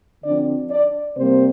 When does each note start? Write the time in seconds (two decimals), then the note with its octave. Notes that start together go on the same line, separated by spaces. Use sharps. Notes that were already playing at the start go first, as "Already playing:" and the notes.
0.25 D3 F3 C4 D4 D5
0.71 D4 D5
1.17 C3 G3 A#3 C4 C5